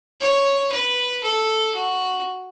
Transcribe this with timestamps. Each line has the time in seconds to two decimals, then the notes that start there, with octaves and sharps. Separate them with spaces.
0.21 C#5
0.72 B4
1.24 A4
1.75 F#4